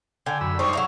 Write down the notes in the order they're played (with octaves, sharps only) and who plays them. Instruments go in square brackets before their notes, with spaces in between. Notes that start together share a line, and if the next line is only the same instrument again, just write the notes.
[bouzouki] D3 [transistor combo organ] G5 G#5
[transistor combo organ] F#2 B5 E6
[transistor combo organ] G3 D#4 C5 [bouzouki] C4 D4 [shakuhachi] C#6
[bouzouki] F#3 E4 A#5